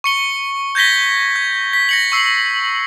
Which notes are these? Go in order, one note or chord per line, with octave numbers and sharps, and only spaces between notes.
C#6 C#7 G7
G6 G#6 A#6 B6 G7
G#6
B6
A#6 C#7 F#7
C#6 E6 C7